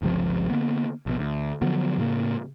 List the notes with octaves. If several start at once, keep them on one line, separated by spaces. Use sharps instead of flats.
G1 C#2 C3 F3
D3 A#3 B3
A#1 B2
D2
D3 F3 F#3 B3
A2 C#3 A#3